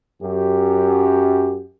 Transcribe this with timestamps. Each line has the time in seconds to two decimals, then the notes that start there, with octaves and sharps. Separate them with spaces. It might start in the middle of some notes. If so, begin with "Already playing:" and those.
0.23 F#2 G4